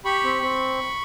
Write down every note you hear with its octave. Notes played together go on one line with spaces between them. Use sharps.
G4 B5 C#6
C4
C4